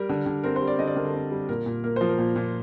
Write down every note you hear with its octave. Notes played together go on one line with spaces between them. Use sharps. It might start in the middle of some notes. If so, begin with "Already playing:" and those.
Already playing: G3 A#4
D3
D3
C4 A#4
C5
G3
D5
D3 D#5
D5
D3 A#4
A4
C4
G3
A#2 A#4
A#2
A#3 A#4
F3 C5
A#4
A#2
A#2